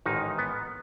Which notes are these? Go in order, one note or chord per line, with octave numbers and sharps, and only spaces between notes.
A1 G#2 D#3 D#4
B3